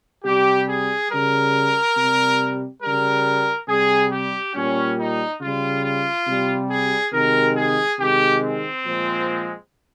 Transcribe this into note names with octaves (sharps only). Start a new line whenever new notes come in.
C3 G3 G4
G#4
C#3 G3 A#4
C3 G3
C#3 G3 A#4
C3 G3 G#4
G4
A#2 G3 C#4
D#4
C#3 G3 F4
F4
C3 G3
G#4
C3 D#3 G#3 A#4
G#4
C3 D#3 G#3 G4
C4
A#2 F3 G#3